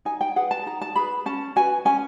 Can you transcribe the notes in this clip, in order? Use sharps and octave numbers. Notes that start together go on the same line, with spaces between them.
D#4 G#5
G5
G#4 B4 F#5
A5
D#4 A#5
A5
G#4 B4 B5
C#4 A5
F#4 B4 G#5
C#4 G#5